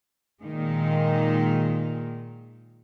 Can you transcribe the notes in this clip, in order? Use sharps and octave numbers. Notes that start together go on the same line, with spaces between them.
A#2 D#3 G#3